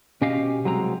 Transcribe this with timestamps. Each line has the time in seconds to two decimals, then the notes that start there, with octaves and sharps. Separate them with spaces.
0.21 B2 C#4 G4 D#5 F5
0.65 C2 F#3 G#3 C4 A#5